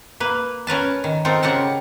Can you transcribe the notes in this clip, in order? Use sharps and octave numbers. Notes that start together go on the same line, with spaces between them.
A#3 B4
C#4 A#4 B4 A5
D#3
C4 D#4 F4 A4 A#4
C#3 G4 A#4 F#5 A5